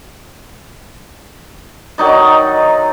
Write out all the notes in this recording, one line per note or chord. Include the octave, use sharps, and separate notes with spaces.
D#3 F#3 D#4 D5